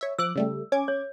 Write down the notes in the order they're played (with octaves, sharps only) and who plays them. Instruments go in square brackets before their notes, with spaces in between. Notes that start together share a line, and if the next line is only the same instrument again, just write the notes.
[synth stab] C#5 E5
[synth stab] F3 D6 F#6 [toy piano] E6
[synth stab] C#3 G3 A3
C#4 D6 G#6
[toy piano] C#5